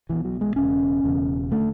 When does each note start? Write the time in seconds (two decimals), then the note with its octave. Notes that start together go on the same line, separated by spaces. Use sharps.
0.09 B1 B2 E3
0.25 F#3
0.41 G#3
0.56 E1 E2 C#3 C#4
1.04 E1 E2 C#3
1.52 D3 A3